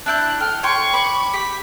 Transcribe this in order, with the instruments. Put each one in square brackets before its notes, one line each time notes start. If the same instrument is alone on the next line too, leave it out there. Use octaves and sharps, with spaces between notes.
[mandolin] D4 E4 G6 [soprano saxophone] A5 [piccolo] F#6
[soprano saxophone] A4 [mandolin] G5 [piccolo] F6
[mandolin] C#5 G5 C6 [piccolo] C#6
[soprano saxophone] B5 [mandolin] D6
[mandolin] G4 [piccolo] B6